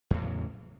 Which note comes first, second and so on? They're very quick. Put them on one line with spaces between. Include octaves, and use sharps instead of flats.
E2 A2 F#3 C#3